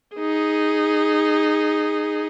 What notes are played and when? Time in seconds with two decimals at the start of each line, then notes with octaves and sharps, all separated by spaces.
0.16 D#4 G#4